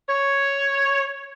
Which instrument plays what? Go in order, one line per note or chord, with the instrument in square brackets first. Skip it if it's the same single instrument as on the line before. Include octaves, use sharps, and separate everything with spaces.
[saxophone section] C#5